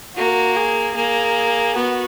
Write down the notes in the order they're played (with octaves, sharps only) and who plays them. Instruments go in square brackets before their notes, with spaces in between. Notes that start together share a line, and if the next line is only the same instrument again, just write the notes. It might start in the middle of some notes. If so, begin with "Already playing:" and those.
[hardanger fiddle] A#3 [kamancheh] F#4
[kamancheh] G#4
[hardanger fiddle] A#3 [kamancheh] G#4
[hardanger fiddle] B3 [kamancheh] F#4